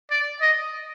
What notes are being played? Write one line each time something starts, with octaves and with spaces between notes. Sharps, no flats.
D5
D#5